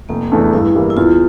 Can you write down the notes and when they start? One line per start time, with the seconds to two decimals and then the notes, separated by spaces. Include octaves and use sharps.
0.09 F1 A#3
0.32 E2 E3 A3 D4
0.53 G2 E4
0.75 E3 G3 A#3
0.90 E4
0.97 E2 F4